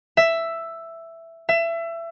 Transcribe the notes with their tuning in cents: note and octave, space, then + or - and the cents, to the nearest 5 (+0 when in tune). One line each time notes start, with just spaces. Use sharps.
E5 +5
E5 +25